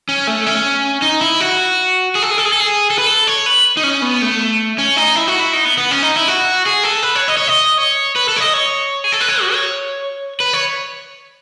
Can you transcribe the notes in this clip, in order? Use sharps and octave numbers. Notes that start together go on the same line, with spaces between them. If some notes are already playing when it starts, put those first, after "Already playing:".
C#4
A3
C#4
D#4
E4
F#4
G#4
A4
G#4
A4
G#4
A4
G#4
A4
B4
A4
C#5
B4
D#4
C#4
B3
A3
C#4
D#4
E4
F#4
E4
D#4
B3
B3
C#4
D#4
E4
F#4
G#4
A4
B4
C#5
D#5
C#5
D#5
C#5
B4
A4
C#5
D#5
C#5
G#4
A4
B4
C#5
F#4
C#5
B4
C#5